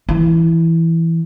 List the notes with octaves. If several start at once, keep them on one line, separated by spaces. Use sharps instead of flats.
E3